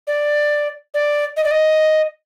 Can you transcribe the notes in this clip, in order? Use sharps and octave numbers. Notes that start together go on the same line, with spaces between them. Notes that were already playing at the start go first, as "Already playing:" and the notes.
D5
D5
D#5
D5
D#5